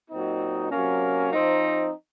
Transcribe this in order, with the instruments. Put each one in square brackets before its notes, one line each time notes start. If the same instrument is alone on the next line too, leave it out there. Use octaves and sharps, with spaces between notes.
[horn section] A#2 F#3 C4 D#4
C3 F#3 A#3 C#4
F3 C4 D#4